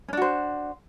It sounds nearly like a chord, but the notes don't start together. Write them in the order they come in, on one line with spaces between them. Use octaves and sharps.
C#4 D4 F#4 C5